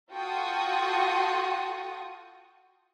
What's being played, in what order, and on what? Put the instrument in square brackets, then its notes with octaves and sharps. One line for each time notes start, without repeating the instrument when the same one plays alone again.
[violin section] F4 F#4 A4 G5 C#6 D#6